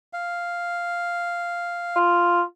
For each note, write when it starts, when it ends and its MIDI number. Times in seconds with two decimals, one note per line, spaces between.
0.13 1.98 77
1.96 2.42 65